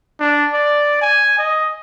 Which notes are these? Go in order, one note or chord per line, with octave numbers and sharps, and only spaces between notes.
D4
D5
G#5
D#5